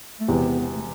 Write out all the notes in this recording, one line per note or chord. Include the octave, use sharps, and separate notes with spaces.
A3
E1 E2 C3 B3
A3